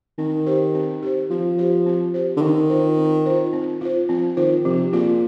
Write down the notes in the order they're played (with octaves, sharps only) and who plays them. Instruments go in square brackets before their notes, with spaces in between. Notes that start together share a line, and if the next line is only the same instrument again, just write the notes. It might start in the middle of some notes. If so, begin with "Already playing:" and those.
[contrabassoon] D#3 [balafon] C4
[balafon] G4 C5
C4
G4 C5
[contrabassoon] F3 [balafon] C4
[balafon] G4 C5
C4
G4 C5
[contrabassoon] D3
[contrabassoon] D#3 [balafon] C4
[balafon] F4 C5
C4
F4 C5
C4
F4 C5
[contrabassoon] F3 [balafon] C4
[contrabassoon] D#3 [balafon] F4 C5
[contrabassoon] C3 [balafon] F3
[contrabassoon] A#2 [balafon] C4 F4 G#4 D5